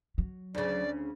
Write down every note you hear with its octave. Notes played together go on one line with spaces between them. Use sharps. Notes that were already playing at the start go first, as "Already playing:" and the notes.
F#3
D2 C#3 D5